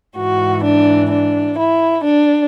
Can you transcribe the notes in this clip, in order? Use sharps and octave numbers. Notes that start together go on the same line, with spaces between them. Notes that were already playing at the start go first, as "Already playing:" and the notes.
G#2 E3 F#4
D4
D4
E4
D4